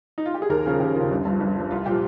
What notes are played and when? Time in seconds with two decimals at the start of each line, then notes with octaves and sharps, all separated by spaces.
0.18 D#4
0.26 F4
0.34 G4
0.42 G#4
0.49 D#2 A#4
0.66 C#3 F3 G#4
0.80 D#2 G4
0.95 C#3 F3 F4
1.11 G1
1.25 G2
1.30 F3
1.40 G1
1.56 G2 F3
1.71 C2 F4
1.86 A#2 F3 G4